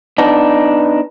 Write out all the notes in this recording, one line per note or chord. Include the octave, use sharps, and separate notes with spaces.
B3 D4 D#4